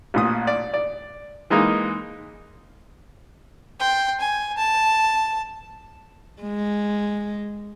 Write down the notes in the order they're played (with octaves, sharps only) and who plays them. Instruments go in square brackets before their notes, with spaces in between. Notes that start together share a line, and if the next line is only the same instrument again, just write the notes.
[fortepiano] A1 A#2 D#6
D5
D5
E3 G#3 A#3 D#4
[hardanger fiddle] G5 C6
G#5
A5
[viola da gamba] G#3